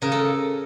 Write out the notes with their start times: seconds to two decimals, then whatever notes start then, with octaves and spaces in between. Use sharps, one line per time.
0.02 C#3 A#4
0.12 A4